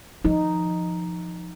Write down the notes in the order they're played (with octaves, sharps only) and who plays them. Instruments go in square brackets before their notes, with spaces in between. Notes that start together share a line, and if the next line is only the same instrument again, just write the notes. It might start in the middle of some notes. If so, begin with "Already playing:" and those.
[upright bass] F3 [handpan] D#4